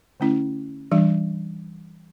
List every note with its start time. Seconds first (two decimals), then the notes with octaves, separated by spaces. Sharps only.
0.20 D3 A3 C#4 E4
0.92 E3 G3 D4